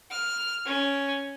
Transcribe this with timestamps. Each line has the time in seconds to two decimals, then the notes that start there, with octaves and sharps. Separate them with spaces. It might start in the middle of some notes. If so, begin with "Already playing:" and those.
0.11 F6
0.66 C#4